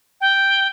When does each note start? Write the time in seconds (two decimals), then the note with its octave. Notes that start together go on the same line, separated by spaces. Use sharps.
0.21 G5